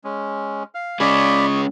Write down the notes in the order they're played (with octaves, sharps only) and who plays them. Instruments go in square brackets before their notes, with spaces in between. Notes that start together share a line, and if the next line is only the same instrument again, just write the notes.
[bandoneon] G#3 C#4
F5 F6
[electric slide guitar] G#3 C#4 G#4 [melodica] D5 B5 [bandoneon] D#5 C#6